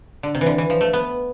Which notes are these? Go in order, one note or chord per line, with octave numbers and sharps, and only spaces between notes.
D3
C3
D3 E3
E3
F3
A3
B3